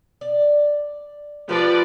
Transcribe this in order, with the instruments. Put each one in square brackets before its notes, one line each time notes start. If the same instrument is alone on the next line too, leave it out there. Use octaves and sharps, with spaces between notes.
[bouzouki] D5
[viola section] F3 B4 D5 [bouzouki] G4 G#4 A#4